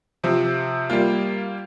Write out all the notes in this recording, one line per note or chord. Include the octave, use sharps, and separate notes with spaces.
C3 F3 C4
G3 A#3 F4